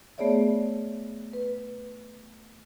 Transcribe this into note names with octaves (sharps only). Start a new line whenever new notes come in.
A3 B3 G#4 C#5 D5 E5
B4